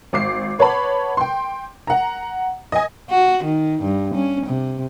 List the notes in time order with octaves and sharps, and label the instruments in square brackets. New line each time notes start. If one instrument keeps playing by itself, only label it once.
[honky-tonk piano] G#1 D6 C7
B4 C#5 F#5 A5 B5
G5 C6
F#5 A#5
D#5 G#5
[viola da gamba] F#4
D#3
G2
C#4
C3